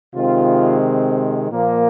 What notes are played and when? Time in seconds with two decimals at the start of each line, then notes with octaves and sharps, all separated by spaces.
0.14 C3 D#3 G#3 C4 F4
1.51 A#2 F3 A#3